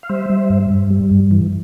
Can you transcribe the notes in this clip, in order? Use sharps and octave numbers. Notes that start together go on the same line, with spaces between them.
F5
G3 C5 E5
G3
G2
G2
G3
G2
E3